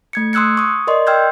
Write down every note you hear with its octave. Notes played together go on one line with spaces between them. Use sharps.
A3 G#6 C#7
C6 D#6 E6 F#6 G#6 C#7
C#6 D#6
A#4 D5 D#5 C6
G5 C6 E6 F6 G6 G#6